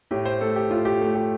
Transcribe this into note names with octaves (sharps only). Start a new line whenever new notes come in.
A2 G4
C5
A3 A4
G4
A2 F4
G4
A3
G4